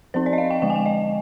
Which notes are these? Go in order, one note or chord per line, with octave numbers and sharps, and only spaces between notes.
F3 C4 D#4 C5
D5
D#5
F5
G5
D3 F3 G#3 G5
G#5
G5
D#5